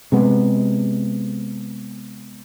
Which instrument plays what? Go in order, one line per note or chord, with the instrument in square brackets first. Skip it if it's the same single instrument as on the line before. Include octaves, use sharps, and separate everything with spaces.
[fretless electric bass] C3 G#3 B3